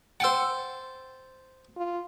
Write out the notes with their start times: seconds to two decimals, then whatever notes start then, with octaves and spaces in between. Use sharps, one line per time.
0.20 C5 F#5 G5 A5 E6
1.77 F4